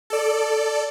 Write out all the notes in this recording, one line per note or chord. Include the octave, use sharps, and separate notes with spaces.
A4 D5